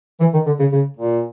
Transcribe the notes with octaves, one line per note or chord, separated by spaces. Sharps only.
E3
D#3
D3
C#3
C#3
A#2